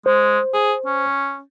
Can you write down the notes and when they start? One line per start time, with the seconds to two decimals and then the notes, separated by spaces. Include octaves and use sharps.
0.06 G#3 C5
0.54 G#4
0.86 C#4